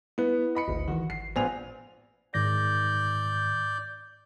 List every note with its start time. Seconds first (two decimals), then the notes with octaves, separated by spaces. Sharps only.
0.18 B3 E4 B4
0.55 D#5 B5 C#7
0.68 G#1 D2
0.88 D#3 E3 F#4
1.10 G#1 C7
1.36 A#1 B3 C5 D5 G#5 F7
2.34 G#2 D#3 D5 G6 A#6